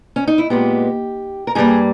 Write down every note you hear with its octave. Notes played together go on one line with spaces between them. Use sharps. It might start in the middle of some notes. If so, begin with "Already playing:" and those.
C#4
D#4
E4
A#2 G#3 B3 G4
A#4
G2 G3 A#3 G#4